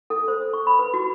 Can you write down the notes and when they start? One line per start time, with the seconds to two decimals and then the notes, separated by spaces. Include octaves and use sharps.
0.10 A4
0.28 C5
0.53 C#6
0.67 B5
0.79 B4
0.94 F#4